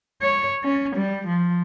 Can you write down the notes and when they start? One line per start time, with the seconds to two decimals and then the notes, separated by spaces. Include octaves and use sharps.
0.22 C#5
0.64 C#4
0.96 G3
1.27 F3